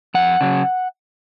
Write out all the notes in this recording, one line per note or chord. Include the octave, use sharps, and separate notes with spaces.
F2 F#5
C#3 F#3